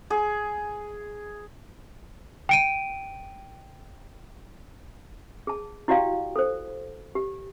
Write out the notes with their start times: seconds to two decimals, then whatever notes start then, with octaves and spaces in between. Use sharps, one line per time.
0.10 G#4
2.49 G5 D7 D#7
5.47 G#4 A5
5.88 E4 F#4 G4 D5 F5 G5
6.36 A4 C5
7.15 G4